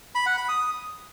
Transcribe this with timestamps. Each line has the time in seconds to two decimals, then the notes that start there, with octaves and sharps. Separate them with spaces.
0.15 B5
0.26 F#5
0.37 B5
0.49 D#6